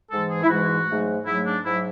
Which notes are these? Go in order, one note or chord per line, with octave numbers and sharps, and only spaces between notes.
G#2 E3 G#3 A4
G#4
E4
G#2 E3 G#3 F#4
G#2 F#3 A3
G#2 F#3 A3 E4
D4
G#2 F#3 A3 E4